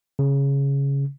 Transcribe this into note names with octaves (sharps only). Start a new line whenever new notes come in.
C#3